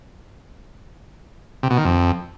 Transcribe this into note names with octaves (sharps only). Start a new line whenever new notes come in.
C3
B2
D#3
F2